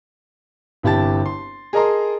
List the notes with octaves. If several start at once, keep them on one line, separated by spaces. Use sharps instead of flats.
G1 C3 E4 G4 A5 A6
C6
G#4 A#4 D#5 A5 A#5 C6